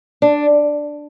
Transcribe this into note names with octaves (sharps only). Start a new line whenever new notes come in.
D4